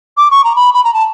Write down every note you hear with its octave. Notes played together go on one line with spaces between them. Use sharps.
D6
C#6
A#5
B5
B5
A#5
A5